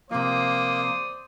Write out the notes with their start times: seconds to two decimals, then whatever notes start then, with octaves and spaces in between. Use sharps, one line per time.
0.11 C3 F3 A#3 C5 D5 D#6